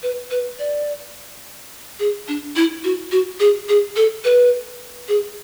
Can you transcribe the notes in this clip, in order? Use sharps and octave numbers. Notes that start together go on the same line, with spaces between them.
B4
B4
D5
G#4
D4
E4
F#4
F#4
G#4
G#4
A4
B4
G#4